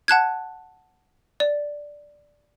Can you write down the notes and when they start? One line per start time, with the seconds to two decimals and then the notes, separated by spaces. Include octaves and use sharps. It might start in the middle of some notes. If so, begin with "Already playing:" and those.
0.08 F#5 A5 F#6 G#6
1.40 D5